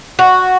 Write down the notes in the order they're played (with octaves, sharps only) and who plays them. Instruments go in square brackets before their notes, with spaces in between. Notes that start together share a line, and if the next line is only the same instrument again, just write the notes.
[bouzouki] F#4